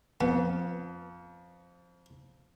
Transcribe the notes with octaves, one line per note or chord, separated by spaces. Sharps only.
F2 B3